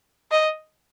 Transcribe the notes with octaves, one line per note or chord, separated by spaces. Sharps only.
D#5